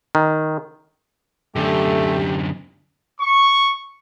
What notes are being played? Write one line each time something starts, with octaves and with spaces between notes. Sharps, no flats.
D#3
F#2 D3 A3 G4
C#6